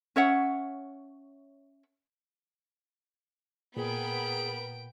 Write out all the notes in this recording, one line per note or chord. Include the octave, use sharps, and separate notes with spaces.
C#4 C#5 E5 F#5
A#2 B3 G#4 A#4 G5 B5 D7